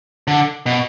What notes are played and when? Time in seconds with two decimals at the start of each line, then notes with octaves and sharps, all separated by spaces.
0.28 D3
0.66 B2